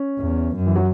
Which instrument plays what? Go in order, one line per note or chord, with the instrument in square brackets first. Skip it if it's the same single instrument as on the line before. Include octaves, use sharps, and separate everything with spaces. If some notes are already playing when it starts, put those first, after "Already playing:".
Already playing: [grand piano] C#4
[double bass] E2
F#2
[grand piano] E3
F#3